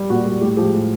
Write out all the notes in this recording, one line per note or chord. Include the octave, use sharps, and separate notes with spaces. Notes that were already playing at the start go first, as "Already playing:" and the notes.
Already playing: G3
A#2 F#4
G3
A2 G4
F3 G#3 G4
A2